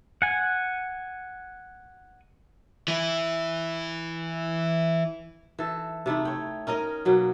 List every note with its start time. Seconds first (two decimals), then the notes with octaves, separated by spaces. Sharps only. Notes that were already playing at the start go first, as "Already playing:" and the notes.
0.22 F#5 G#5
2.88 E3 E4
5.59 E3 A4
6.06 C3 A3 D#4 E4
6.25 C#5 G5
6.67 C#4 D#4 A#4 D#5
7.05 B2 F#3 A#3